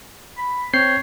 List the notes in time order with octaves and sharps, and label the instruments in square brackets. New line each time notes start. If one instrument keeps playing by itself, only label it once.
[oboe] B5
[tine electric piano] C4 G6 C7 [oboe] C#5